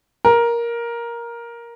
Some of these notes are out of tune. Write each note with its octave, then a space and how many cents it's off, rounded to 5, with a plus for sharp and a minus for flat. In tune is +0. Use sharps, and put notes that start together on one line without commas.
A#4 +10